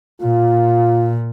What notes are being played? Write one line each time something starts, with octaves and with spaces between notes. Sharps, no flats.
A#2 F4